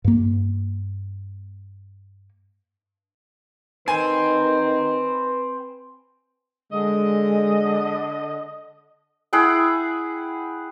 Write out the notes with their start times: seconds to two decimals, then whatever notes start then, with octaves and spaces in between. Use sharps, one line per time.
0.04 G2 A#3
3.88 D#3 C4 B4 G#5
6.73 D3 G#3 D#5
9.33 E4 G#4 F#5 G5